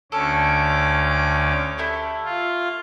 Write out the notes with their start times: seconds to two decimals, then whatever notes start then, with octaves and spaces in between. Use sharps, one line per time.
0.12 D2 C#4 A4 D6
1.78 A3 E4 G4
2.25 F4